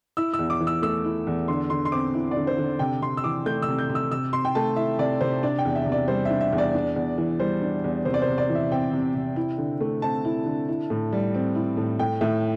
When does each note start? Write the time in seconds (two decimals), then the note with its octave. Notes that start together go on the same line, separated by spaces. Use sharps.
0.17 E4 E6
0.33 E6
0.39 E2
0.50 D6
0.60 E3
0.67 E6
0.82 A3 E6
1.05 E4
1.27 E2
1.48 D3 C6
1.70 D3 C6
1.85 C6
1.92 C4 D6
2.14 E4
2.31 D5
2.37 D3
2.47 C5
2.58 D3
2.79 C3 G5
3.02 C3 C6
3.17 E6
3.24 E3 D6
3.46 A3 G6
3.62 E6
3.68 C3
3.78 G6
3.89 C3
3.95 E6
4.11 C3 E6
4.33 C3 C6
4.45 G5
4.55 A3 A5
4.76 E4 E5
4.98 C3 D5
5.21 C3 C5
5.43 D4 D5
5.59 G5
5.65 E2
5.75 E5
5.86 C3
5.92 D5
6.08 G3 C5
6.25 D4 E5
6.41 E5
6.52 E2
6.58 D5
6.75 D4
6.96 E2
7.18 E3
7.40 G3 C5
7.62 D4
7.84 E2
8.05 C3 C5
8.14 D5
8.22 C5
8.28 C3
8.38 D5
8.49 E3
8.55 E5
8.72 C4 G5
8.93 C3
9.15 C3
9.36 E4
9.58 D3
9.81 A3
10.02 C4 A5
10.25 E4
10.46 D3
10.69 E4
10.90 A2
11.13 G3
11.34 C4
11.55 E4
11.77 A2
11.99 A2 G5
12.21 A2 E5